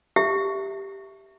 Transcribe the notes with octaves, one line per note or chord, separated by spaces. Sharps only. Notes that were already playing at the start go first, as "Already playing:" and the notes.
G4 E5